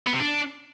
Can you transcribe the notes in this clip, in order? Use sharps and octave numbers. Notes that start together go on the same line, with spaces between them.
B3
C3
D4